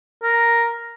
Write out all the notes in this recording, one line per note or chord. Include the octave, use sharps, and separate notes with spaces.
A#4